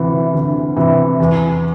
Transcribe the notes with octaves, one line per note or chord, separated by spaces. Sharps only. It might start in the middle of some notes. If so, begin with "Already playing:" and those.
Already playing: D2 C3 E3
D2
C3 E3
E2